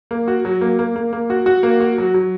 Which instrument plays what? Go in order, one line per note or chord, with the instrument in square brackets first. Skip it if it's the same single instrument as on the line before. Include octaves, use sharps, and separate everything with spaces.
[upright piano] A#3
F#4
F#3
A#3
A#3
A#3
A#3
F#4
F#4
A#3
F#4
F#3
F#3